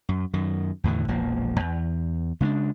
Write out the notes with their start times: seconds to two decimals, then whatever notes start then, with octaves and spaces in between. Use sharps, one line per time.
0.09 F#2
0.34 F#2 D#3
0.84 E2 A2 D3 D#3
1.08 E1 A#1 F3 A#3
1.60 E2
2.40 C#3 G#3 C4 D4